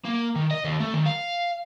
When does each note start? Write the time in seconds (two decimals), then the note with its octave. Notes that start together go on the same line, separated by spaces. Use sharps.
0.05 A#3
0.36 D#3
0.51 D#5
0.65 D#2
0.80 A3
0.94 D#3
1.06 F5